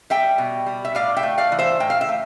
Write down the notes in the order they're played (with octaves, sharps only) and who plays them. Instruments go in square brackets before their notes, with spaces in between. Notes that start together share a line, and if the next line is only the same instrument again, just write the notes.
[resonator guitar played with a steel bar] G3 E5 G5
B2
G3
E5
A2 D5 F5
E5 G5
A3
D5 F5
E3
C5 E5
A2 G5
F5
E5
A3